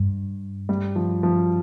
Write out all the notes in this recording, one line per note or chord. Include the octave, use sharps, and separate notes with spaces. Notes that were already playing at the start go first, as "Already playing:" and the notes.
Already playing: G2
G3
F3
F3